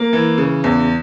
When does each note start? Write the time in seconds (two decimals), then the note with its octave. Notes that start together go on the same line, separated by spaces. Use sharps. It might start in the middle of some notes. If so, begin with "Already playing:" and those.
Already playing: A#3
0.13 E3
0.38 C#3
0.64 E2